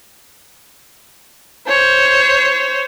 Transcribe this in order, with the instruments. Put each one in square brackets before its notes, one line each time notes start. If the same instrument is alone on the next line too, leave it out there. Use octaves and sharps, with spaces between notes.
[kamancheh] C5 C#5